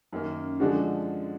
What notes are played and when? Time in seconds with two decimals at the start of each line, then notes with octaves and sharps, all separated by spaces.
0.13 F#2 D#3 A#3
0.60 D3 F3 G#3 D4 F#4